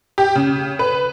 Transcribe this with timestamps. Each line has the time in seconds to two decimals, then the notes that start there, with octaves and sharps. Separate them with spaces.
0.18 G4
0.36 C#3
0.79 B4